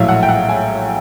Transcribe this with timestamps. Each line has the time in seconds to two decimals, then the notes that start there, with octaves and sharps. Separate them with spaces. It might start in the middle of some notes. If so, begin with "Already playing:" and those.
Already playing: A#1 A2 F#3 A3 E5 F5
0.09 F#5
0.23 G5
0.29 F#5
0.49 G#5